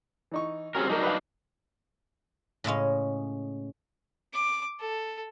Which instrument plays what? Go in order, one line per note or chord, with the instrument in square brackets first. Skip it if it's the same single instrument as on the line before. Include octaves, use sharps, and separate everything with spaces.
[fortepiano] E3 D#4 C#6
[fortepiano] G3 F#4 G#4 [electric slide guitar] C4 C#4 A#4
[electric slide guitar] F#3 D4 D#4 [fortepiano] F#4 A#4 D5
[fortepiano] B4 F5
[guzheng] A2 C#3 G#3 C#4
[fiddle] D6
A4